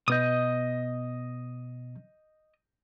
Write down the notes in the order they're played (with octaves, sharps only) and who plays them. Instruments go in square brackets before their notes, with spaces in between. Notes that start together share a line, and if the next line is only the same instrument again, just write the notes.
[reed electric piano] B2 B3 G6 [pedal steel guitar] D#5 D#6